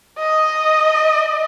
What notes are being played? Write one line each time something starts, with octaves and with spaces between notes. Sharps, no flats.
D#5